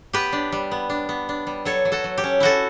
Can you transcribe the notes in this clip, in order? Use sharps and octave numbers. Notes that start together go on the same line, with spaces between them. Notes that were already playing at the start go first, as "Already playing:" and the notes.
B3 G4 B4
D4
G3
B3
D4
B3
D4
G3
F#3 A4 C#5
F#3
F#4 A4
F#3
G4
C#4
E4 F#4 A4